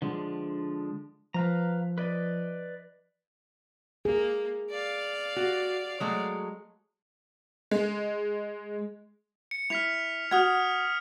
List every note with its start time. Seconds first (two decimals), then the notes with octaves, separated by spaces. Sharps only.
0.02 D3 F3 G#3
1.34 F3 B4 F5 A#5
1.98 B4 D5 D#5
4.05 A#3 G#4
4.71 D5 F5
5.36 F#4
6.00 F#3 G#3 A3
7.71 G#3
9.51 C#7
9.70 E4 F6 B6 F7
10.31 F#4 F#5 D#6 F6 G#6